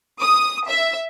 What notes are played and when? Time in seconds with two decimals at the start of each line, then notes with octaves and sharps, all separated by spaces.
0.21 D#6
0.67 E5